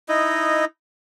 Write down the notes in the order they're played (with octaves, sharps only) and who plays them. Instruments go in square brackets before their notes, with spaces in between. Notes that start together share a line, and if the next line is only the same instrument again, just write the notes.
[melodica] D#4 E4 D#5